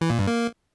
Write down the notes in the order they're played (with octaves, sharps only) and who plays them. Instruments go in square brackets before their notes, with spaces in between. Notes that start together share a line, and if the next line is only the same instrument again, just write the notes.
[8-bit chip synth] E3
A#2
G2
A#3